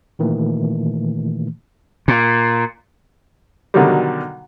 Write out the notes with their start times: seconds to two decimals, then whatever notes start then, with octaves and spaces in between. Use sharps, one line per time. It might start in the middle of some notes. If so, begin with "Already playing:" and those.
0.19 A#2 D#3 E3 A3 A#3
2.08 A#2
3.74 B2 D3 D#3 F#3 G3